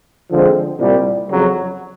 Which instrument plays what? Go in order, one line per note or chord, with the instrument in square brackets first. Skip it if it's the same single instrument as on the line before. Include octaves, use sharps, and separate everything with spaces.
[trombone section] D3 F3 G#3 C4
C2 A#2 G3
F2 C#3 F#3